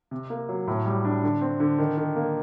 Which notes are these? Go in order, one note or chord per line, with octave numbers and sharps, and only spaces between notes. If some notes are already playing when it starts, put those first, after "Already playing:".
C3
A#3
F#3
A2
G3
D4
D3
C4
D3
D#3
D#3
A#3